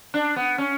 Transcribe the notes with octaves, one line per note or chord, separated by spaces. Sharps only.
D4
B3
C#4